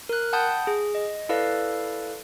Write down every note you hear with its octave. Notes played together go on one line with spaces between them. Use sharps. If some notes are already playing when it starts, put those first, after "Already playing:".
A#4 F#6
F#5 G5 A5 B5 D#6 G6
G#4
D#5
E4 A4 B4 D5 F5